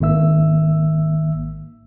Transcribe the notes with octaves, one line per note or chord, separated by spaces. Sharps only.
G#1 D#3 A#3 E5 E6